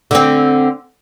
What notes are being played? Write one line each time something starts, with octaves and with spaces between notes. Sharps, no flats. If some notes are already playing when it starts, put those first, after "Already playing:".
D3 C4